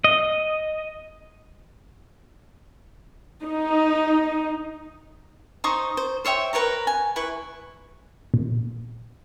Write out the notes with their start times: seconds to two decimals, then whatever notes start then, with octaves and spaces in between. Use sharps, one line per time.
0.04 D#5
3.42 D#4
5.64 D#4 C5 C#6 D#6
5.97 C5
6.25 C5 C#5 E5 G5
6.53 A#4 B4 C#5 A#5
6.87 G#5
7.16 E4 B4 C#6
8.34 A#2